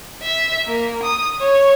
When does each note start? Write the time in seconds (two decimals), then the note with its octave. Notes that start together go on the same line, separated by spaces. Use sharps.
0.22 E5
0.66 A#3
1.03 D#6
1.40 C#5